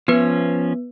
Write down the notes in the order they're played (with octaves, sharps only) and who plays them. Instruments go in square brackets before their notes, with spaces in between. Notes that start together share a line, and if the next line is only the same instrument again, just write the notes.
[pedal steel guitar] F3 C#4 [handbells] B3 B4